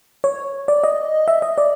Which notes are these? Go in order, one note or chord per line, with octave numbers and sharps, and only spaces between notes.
C#5
D5
D#5
E5
D#5
D5